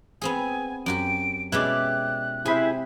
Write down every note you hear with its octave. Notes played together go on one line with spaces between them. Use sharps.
B3 C4 G#4 G#5
F#2 F#4 G4 D7
B2 G#3 C#4 E4 G4 D5 F#6
C3 E4 G#4 C5 B5